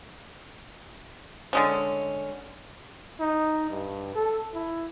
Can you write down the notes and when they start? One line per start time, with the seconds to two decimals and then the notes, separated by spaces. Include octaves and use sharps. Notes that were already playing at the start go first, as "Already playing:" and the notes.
1.53 D3 G#3 C#4
3.20 D#4
3.71 G2
4.15 A4
4.54 E4